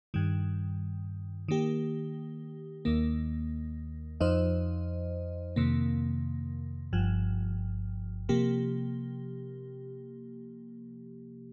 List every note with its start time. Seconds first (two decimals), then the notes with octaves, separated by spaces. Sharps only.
0.14 G2 D#3 G3
1.48 D#3 A#3 G4
2.85 D#2 D#3 A#3
4.20 F2 F3 D#4 C5 D#5
5.56 F2 C3 D#3 A#3
6.93 G1 G2 F3
8.29 C3 F3 A#3 G4